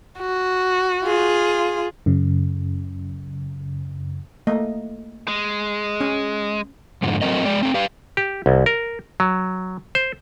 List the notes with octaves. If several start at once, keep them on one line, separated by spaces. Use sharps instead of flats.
F#4
F4 G#4
F#2 C#3
A3 A#3 D#5
G#3
C#4
F2 G#2 D3
F#3 A3 C4 A#4 D#5
G#3 D5
A3 C4
G4 B4 F5
G4
C2
A#4
F#3
C5